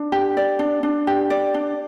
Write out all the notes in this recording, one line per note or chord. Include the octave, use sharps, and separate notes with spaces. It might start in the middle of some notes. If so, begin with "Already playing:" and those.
Already playing: D4
G4
D5
D4
D4
G4
D5
D4